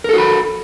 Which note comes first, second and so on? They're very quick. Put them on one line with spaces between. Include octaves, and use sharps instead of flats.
A#4 A4 F#4 B5